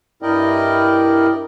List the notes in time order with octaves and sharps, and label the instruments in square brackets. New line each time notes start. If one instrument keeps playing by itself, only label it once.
[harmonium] G2 E4 A#4 D5 D#5 G5